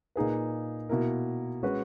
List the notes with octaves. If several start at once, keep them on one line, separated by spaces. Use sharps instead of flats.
A#2 A#3 D#4 G#4 B4
B2 A#3 E4 A#4
G#3 C#4 F#4 B4